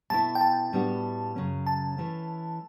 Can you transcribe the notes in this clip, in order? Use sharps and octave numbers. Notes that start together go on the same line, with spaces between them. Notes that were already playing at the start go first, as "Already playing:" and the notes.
B2 A3 E4 A5
G5
A5
A2 G3 B3 D4 F#4
F#2 C#3 F#3 C#4
A5
E3 A3 C#4